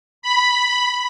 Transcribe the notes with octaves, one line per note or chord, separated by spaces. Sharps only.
B5